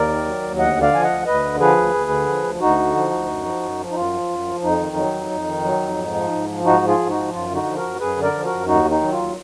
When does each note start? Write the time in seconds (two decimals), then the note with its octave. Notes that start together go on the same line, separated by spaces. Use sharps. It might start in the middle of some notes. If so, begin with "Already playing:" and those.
Already playing: D#2 A#4 D5
0.08 D#3
0.25 F#3
0.42 D#2
0.58 D2 D#5 F#5
0.76 D3
0.81 D5 F5
0.93 F3 G#5
1.04 D#5 F#5
1.10 D2
1.26 D2 B4 D#5
1.43 D3
1.60 F3 G#4 B4
1.77 D2
1.94 D2
2.11 D3
2.28 F3
2.44 D2
2.61 D2 D#4 F#4
2.78 D3
2.95 F3
3.11 D2
3.28 F#2
3.45 F3
3.62 F#2
3.79 F3
3.91 D#4
3.96 F#2 F4
4.13 F3
4.29 F#2
4.47 F3
4.63 F2 D#4
4.81 D#3
4.96 F#3
5.14 F2
5.30 F2
5.47 D#3
5.64 F#3
5.81 F2
5.98 G#2
6.14 F3
6.31 G#2
6.48 F3
6.65 G#2 D#4 F#4
6.82 F3
6.87 F4 G#4
6.99 G#2
7.10 D#4 F#4
7.15 F3
7.33 F#2 F4
7.50 D3
7.55 D#4 F#4
7.66 F3
7.77 F#4 A#4
7.83 F#2
7.99 F#2 G#4 B4
8.17 D3
8.22 A#4 D5
8.34 F3
8.45 F#2 F#4 A#4
8.67 D#2 D#4 F#4
8.85 D#3
8.90 D#4
9.01 F#3
9.12 F4
9.18 D#2